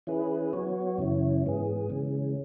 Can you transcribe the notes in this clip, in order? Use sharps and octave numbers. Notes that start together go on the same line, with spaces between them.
E3 C#4 E4 G#4 B4
F#3 B3 F#4 C#5
F#2 C#3 E3 C#4 E4
G#2 E3 B3 G#4
C#3 E3 G#3 C#4